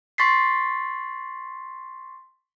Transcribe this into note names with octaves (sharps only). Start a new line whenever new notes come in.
C6 C#6 A6 B6 C7